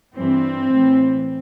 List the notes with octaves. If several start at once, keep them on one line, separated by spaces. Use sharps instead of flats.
G2 E3 C4
A2 E3